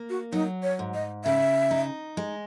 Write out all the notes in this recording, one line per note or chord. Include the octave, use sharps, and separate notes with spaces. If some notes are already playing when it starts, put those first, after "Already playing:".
Already playing: A#3
F#4
F#3 D#4
C#5
G#2
D#5
C#3 E5
D#4
G#3